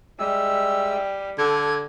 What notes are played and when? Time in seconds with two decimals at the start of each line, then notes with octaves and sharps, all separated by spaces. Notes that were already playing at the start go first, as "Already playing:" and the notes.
0.19 G3 G#3 E5 E6
1.38 D3 A4 G#6